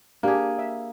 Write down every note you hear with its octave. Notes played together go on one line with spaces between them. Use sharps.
A#3 D4 G4 G#4
E5